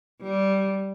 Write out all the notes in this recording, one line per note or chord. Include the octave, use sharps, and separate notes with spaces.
G3